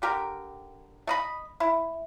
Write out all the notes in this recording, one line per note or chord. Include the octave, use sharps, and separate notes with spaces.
D3 G4 A#4 G5
A3 D#5 B5
E4